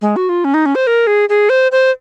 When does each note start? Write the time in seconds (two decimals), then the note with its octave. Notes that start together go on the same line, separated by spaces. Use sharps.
0.02 G#3
0.16 F#4
0.29 F4
0.45 C#4
0.54 D#4
0.66 C#4
0.75 C5
0.87 A#4
1.07 G#4
1.29 G#4
1.50 C5
1.72 C5